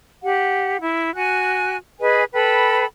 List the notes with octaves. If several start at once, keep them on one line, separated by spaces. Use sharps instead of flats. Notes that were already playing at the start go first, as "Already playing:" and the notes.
G4 F#5
E4
F#4 G#5 F#6
G#4 B4 D#5 G#5
A4 B4 G5 B5